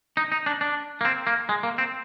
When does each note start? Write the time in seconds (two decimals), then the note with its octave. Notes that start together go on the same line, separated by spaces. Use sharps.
0.17 D#4
0.32 D#4
0.46 D4
0.61 D4
1.01 A#3
1.05 C4
1.27 A#3
1.49 G#3
1.63 A#3
1.78 C4